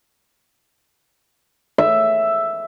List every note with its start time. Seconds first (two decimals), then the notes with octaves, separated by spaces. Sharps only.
1.78 E5